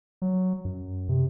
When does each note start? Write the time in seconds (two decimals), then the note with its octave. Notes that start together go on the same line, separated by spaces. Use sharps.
0.22 F#3
0.65 F#2
1.09 C3